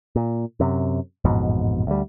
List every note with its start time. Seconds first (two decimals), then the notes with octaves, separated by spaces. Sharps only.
0.16 A#2
0.60 F#2 C3
1.24 A1 F2 G#2 B2
1.87 D2 G3